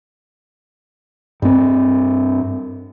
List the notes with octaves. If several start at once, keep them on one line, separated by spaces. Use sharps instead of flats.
G2 C4